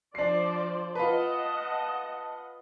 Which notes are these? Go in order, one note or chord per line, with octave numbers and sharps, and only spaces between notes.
F3 D4 C5 D5 C7
F4 B4 D#5 F#5 A5